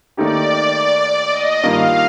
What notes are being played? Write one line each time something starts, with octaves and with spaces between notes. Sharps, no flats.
D#2 D#3 A3 D#4 G4 D5
D#5
G2 D#3 A#3 F4 F5